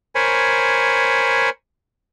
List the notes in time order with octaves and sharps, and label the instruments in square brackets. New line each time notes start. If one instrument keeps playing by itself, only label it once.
[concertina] A#4 C5 C#5 G#5 B5